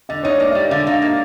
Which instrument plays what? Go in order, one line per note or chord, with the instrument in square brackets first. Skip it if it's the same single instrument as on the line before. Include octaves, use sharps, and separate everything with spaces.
[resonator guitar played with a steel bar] D3 [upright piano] D#5
[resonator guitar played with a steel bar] D#4 [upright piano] C#5
[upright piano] D5
[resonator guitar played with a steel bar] A#3
[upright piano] E5
[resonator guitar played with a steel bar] G3
[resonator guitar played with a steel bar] D3 [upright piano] F5
[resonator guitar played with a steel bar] D#4
[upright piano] F5
[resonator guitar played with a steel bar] A#3